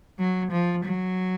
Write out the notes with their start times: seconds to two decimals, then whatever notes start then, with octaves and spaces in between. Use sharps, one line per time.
0.19 F#3
0.52 F3
0.85 F#3